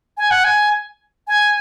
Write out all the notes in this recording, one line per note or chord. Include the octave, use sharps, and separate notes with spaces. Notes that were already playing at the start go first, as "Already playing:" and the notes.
G#5
F#5
G#5
G#5